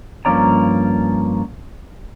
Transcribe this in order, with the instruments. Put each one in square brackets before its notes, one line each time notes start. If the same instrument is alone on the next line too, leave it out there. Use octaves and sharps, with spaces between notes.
[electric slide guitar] G2 F3 A#3 C#4 D5 A#5